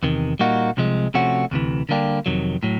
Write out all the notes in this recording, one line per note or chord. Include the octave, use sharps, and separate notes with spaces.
E2 C3 D#3
A#2 G3 A#3 D#4 F#4
C2 C3 F3 G#3
C3 F3 A3 C#4 F#4
D2 C3 E3
D3 G3 A#3 D4 G4
F2 C3 D#3 F#3
A2 F#3